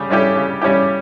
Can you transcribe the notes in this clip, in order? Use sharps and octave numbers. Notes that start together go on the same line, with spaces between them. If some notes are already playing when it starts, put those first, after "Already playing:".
Already playing: C#3 G3 G4
G3 C#4 E4 G4
C#3
G3 C#4 E4 G4